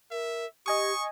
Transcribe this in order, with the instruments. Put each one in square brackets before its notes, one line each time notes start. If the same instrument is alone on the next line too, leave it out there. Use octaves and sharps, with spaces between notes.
[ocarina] A#4 [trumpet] E5
[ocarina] G4 [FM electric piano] D#5 G#5 D#6 [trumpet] C#6